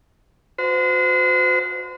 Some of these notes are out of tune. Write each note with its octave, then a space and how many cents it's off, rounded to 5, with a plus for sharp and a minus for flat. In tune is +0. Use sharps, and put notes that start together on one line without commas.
F#4 -35 C5 -35